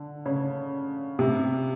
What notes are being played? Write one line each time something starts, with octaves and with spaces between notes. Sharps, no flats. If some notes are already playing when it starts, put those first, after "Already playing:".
Already playing: D3
C#3
C3